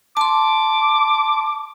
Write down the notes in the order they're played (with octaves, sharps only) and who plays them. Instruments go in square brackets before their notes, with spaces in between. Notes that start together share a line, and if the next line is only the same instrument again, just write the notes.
[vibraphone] A5 C6 [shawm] D6